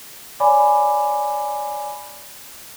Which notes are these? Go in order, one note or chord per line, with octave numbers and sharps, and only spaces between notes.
C#5 D5 G#5 B5 D6